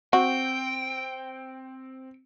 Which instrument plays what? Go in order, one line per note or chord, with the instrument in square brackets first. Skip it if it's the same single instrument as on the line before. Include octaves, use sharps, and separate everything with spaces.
[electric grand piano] C4 [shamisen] F#4 [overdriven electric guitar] G5